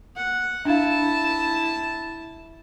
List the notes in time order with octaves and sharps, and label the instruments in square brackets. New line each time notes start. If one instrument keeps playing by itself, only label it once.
[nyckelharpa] F#5
[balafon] D4 F5 [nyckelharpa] E4 A5